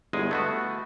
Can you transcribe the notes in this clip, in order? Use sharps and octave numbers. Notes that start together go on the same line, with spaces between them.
G1 E2 G#3 G#5
A3 B3 F#4